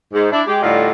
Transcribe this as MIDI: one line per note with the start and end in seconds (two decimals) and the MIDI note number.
0.13 0.31 44
0.32 0.42 62
0.32 0.42 64
0.47 0.58 56
0.47 0.58 67
0.62 0.91 45
0.62 0.91 50
0.62 0.91 55
0.62 0.91 63
0.62 0.91 65